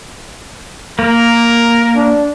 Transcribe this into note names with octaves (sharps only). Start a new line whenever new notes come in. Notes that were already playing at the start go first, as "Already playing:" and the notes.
A#3 A#4
D4